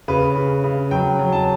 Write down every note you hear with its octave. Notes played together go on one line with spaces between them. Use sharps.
C#3 B4
C#3
C#3
F#3 G5
F#3
A5